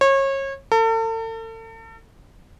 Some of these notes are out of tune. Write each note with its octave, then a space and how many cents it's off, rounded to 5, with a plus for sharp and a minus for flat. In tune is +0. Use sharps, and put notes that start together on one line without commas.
C#5 -30
A4 +40